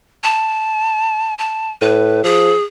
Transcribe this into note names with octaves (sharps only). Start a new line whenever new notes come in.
A5
A5
A2 B4
F3 G#4